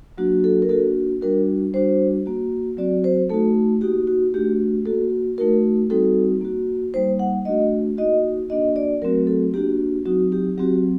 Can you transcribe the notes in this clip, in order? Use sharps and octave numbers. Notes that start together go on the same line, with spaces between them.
F#3 A#3 D4 F#4
A4
A#4
A#3 D4 F#4 A4
G3 D4 F#4 A#4
G3 D4 F#4 C5
A#3 F#4
F#3 C4 F#4 D5
C5
A3 D#4 F#4 A4
A#3 D#4 F#4 G4
F#4
A3 D4 F#4 G4
A#3 F#4 A4
A3 D#4 F#4 A#4
G3 C4 D#4 F#4 A4
A#3 F#4
G3 A#3 D#4 C5
F#5
A3 D4 F#4 D#5
A#3 D#4 F#4 D#5
A#3 D4 F#4 D#5
D5
F#3 A3 C4 F#4 A#4
A4
A#3 D4 F#4 G4
F#3 C4 D#4 F#4
G4
F#3 C4 F#4 G4